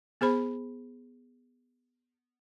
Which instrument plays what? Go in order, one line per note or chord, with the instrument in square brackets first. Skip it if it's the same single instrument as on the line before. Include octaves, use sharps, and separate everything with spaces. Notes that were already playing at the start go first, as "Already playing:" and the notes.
[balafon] B3 G#4 C5 B5